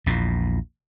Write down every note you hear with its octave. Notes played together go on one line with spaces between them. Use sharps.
A#1 E2 A#2